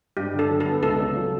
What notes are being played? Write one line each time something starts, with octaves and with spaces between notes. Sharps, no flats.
G2 G4
D3
A4
F#3
A4
B3
C#2 A4
C#3
F#3